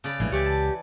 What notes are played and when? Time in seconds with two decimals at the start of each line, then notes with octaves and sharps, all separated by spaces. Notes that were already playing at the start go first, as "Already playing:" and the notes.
0.04 C#3 D5 B5
0.20 A#1 A2 E3 G#3
0.32 C#2 G4 C#5 D5 E5
0.46 A5